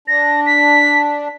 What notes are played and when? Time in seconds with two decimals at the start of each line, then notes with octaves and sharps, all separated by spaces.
0.08 D4 A#6
0.46 B6